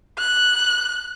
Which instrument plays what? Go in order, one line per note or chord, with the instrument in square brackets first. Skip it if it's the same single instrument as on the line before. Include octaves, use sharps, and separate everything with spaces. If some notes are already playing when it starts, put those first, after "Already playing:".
[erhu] F#6